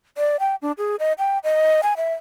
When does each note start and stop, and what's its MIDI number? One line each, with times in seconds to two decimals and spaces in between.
0.18 0.37 74
0.40 0.56 79
0.62 0.72 62
0.78 0.96 68
1.00 1.13 75
1.19 1.38 79
1.44 1.81 75
1.83 1.94 80
1.97 2.13 76